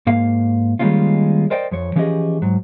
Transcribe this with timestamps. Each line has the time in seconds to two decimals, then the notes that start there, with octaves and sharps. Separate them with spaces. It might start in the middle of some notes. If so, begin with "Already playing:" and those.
0.07 G#2 A#3 F5
0.79 D#3 G3 G#3 A#3 C#4 F4
1.50 A#4 C5 D5 D#5 G5
1.71 F2 F3 C#5
1.96 E3 F3 C#4 G4 G#4 D#5
2.42 G#2 F#3